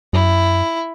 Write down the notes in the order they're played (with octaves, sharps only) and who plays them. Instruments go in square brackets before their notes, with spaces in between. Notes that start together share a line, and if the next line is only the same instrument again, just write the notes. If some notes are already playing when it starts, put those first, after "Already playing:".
[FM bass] F#2 [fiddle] E4